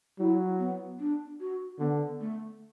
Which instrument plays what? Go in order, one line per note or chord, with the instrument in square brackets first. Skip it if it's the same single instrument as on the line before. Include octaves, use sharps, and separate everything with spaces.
[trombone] F#3 [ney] E4
[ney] B3
D4
F#4
[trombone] D3 [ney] B3
[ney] A3